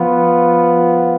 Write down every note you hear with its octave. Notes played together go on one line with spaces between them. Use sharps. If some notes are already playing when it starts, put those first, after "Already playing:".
Already playing: F3 B3 F4